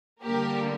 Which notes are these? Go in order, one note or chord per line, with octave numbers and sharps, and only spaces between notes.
D3 G3 A#3 G4 A#4